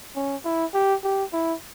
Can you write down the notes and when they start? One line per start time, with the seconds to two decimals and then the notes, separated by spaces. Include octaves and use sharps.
0.16 C#4
0.45 E4
0.74 G4
1.04 G4
1.33 E4